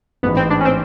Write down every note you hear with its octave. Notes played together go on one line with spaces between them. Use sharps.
A1 G#2 E3 B3
C4
D4
C#4
C4